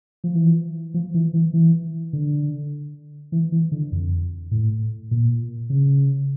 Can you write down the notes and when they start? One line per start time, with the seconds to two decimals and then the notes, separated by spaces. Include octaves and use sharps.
0.24 F3
0.35 E3
0.94 F3
1.14 E3
1.34 E3
1.54 E3
2.13 D3
3.32 E3
3.52 E3
3.72 D3
3.92 F2
4.51 A2
5.11 A#2
5.70 C#3